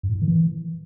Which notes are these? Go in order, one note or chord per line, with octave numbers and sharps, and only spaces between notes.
G2
A2
G#2
D#3
E3